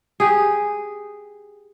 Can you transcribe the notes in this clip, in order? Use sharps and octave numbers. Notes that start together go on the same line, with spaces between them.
G4 G#4